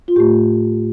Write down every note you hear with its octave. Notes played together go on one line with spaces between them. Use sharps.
F4
A2 A3 G4